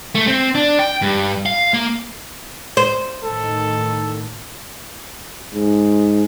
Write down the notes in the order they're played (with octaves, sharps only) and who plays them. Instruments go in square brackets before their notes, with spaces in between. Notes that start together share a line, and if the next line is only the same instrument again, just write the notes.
[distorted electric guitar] A3
C4
D4
G5
G2
F5
A#3
[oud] C5
[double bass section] A2 D#3 [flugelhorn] A4
[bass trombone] G#2